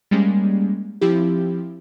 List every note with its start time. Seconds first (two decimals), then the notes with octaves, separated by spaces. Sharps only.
0.11 G3 G#3 A#3 C#4
1.01 F3 C4 E4 G4